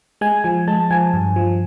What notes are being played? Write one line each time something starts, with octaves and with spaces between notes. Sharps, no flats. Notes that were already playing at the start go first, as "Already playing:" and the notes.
G#3 G#5
F3 G#5
G#3 A5
F3 G#5
G2
F3